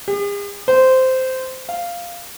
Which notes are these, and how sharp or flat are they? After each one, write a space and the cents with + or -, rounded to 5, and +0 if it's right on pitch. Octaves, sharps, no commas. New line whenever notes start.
G#4 -45
C5 -10
F5 -5